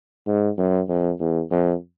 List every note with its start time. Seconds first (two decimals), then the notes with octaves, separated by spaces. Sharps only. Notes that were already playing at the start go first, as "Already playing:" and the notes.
0.27 G#2
0.58 F#2
0.88 F2
1.20 E2
1.51 F2